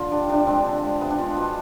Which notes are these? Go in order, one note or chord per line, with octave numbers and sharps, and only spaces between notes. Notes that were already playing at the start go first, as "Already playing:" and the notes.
Already playing: D3 F4
G3 D4
C3 D4
F3 G#3 C4
D3
G#3
C3 B3
D4
F3 G#3 F4
B2 F4